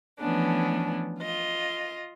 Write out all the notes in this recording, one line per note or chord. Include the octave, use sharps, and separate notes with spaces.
E3 F3 A3 B3 C#4 D4
F4 D#5